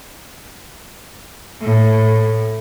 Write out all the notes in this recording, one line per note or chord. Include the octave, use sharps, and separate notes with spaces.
A2